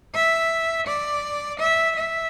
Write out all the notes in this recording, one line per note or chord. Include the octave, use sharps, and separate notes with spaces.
E5
D5
E5
E5